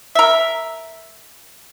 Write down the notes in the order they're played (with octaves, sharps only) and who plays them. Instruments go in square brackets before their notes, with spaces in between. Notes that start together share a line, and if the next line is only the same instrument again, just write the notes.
[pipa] A#4 E5